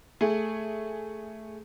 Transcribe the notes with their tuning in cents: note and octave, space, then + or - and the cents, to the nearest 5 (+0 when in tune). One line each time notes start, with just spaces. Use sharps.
A3 +0 G#4 +0